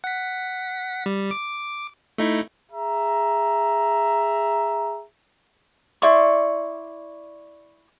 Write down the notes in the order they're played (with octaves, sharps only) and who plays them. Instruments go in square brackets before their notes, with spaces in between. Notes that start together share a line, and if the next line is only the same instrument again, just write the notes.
[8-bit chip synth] F#5 B6
G3
D6
A3 D#4 E4
[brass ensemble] G#4 E5 A#5
[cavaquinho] E4 D5 C6 C#6